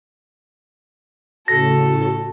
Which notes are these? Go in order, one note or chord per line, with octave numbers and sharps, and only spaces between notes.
A2 C#3 F#4 A4 A#6